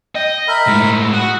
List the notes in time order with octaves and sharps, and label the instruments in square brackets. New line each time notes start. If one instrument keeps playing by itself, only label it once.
[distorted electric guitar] D#5 [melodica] G5
[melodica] A#4 E5 B5
[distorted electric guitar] A2 G#3
[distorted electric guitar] F#4 [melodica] F#5 D#6